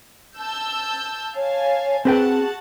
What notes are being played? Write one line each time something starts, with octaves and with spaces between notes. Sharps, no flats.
A5 E6 G6
C#5 F5 G#5 A5
C4 F#4 G#4 B4 F#5 G5 A5